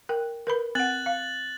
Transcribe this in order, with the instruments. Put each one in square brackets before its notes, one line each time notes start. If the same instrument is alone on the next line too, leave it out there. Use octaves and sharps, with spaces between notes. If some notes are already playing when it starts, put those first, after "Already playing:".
[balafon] A#4 G5
A#4 B4 B5
[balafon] C4 F#5 [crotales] F#6 A6 F#7
[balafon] F5